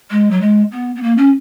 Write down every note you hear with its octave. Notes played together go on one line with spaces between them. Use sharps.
G#3
F#3
G#3
B3
B3
A#3
C#4